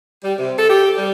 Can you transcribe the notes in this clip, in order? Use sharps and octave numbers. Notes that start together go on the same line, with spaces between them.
G3
C3
A4
G4
G3